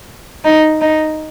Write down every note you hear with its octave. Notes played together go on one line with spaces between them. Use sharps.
D#4
D#4